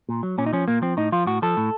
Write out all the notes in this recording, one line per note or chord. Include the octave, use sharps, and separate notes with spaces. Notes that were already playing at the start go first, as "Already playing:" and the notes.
A#2
F#3
A#2 C#4
D#4
F3 C#4
A#2 A#3
F3 C4
A2 D#4
F3 F4
A2 F#4
F3 A4
A2